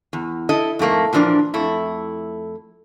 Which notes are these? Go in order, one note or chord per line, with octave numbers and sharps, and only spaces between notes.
E2
E4 A4 D#5
F2 G#2 A3 A#3
A#2 E3 F3 D4 A#4 D5
F2 A3 E4